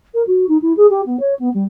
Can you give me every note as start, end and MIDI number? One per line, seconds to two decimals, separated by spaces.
0.14 0.22 70
0.27 0.45 66
0.48 0.57 63
0.62 0.73 64
0.77 0.86 68
0.90 1.01 67
1.06 1.19 59
1.19 1.34 73
1.39 1.49 59
1.54 1.65 55